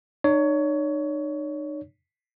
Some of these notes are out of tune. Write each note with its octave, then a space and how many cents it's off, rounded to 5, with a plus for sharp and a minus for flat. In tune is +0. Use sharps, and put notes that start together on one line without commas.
D#4 -40 C#5 +20